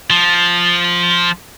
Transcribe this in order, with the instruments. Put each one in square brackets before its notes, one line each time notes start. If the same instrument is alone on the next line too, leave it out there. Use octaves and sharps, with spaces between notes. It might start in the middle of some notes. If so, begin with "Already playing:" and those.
[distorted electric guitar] F3